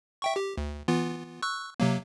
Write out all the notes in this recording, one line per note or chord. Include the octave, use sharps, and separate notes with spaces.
E5 G5 C#6
G4
D2
E3 B3 F4
C#6 E6 F#6
C3 F#3 A#3